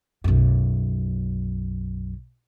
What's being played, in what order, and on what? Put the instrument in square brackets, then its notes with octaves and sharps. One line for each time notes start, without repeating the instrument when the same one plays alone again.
[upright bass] B1 F#2